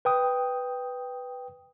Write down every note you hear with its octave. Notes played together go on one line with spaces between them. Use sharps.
B4 G5 D#6